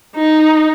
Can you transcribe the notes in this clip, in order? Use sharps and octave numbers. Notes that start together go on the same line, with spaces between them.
D#4